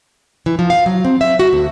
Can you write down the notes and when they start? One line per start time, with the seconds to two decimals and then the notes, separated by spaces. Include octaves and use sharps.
0.46 E3
0.59 F3
0.70 F5
0.86 F#3
1.05 C4
1.21 E5
1.39 F#4
1.53 D2